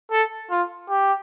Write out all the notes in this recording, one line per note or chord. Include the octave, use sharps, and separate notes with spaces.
A4
F4
G4